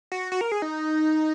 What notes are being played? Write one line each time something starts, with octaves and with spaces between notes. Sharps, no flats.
F#4
F#4
A#4
G#4
D#4